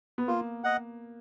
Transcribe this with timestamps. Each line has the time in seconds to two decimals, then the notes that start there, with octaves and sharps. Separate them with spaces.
0.18 B3
0.28 A#3 F4
0.64 D#5 F#5